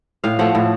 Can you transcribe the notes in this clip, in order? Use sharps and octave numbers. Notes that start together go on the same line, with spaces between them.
A2 F5
F3 A3 F#5
A2